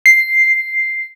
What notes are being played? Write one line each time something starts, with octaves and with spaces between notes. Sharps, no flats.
C7